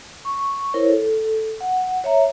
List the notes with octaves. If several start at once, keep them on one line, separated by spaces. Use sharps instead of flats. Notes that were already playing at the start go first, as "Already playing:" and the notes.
C#6
E4 A#4 C5 C#5
A4
F#5
C#5 E5 A#5